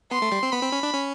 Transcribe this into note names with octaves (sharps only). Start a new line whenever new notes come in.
B3 C6
A3
G3
C4
B3 B5
C4
C#4
D4
C#4